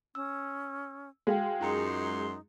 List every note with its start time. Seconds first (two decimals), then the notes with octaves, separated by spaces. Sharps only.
0.15 C#4 E6
1.27 G#3 F#4 F5 G5
1.61 F#2 D#4 F4 A#5 C6 C#7